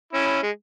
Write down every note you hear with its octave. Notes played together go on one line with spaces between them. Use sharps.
C#4 E4
G#3